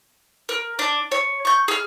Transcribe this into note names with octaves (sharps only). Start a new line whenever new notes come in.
A#4
D4
C#5
C#6 G6
G#4 F6